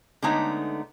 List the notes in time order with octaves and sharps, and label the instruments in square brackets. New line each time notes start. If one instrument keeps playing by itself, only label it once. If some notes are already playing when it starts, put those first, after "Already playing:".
[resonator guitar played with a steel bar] D3 G#3 A3 B3 D#4 C#5